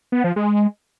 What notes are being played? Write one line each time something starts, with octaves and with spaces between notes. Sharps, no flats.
B3
F3
G#3